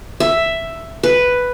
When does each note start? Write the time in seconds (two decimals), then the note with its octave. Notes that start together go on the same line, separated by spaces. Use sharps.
0.20 E5
1.03 B4